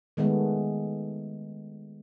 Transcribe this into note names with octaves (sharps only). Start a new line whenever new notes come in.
D#3 G#3 A3 B3